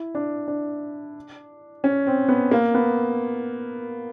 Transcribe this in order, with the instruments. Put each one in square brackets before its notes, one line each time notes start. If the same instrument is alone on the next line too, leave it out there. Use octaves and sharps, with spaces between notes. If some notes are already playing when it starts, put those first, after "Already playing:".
Already playing: [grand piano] E4
D4
D4
C#4
C4
B3
A#3
B3